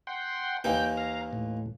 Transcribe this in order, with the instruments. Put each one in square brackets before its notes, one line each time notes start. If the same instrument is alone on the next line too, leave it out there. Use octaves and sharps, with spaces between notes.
[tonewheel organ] F#5 G5 C6
[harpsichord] D#2 E3 A#3 [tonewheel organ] G5 G6
[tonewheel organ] F5 A#5
A2